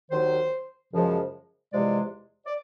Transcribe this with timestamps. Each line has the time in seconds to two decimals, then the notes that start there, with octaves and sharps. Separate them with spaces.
0.10 D#2 D#3 F#3 C5
0.91 F#2 C#3 F3 G#3
1.72 E2 C3 F3 G#3 D5
2.46 D5